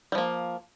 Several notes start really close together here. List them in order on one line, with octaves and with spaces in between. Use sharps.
G3 F3 A#3